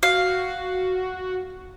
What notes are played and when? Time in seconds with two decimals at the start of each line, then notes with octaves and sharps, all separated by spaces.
0.03 F#4 F5